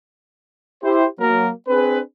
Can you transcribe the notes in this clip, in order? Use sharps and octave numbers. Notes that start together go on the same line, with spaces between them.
E4 G4 C5
F#3 A#3 A#4
C4 D4 G#4 B4